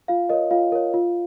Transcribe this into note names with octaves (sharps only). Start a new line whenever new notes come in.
F4 F5
A#4 C#5 D#5
F4 F5
A#4 C#5
F4